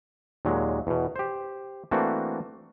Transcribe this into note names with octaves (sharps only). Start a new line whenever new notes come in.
D#2 A#2 F#3 G#3
E2 B2
G4 C5
E3 A3 A#3 C4 D4 F#4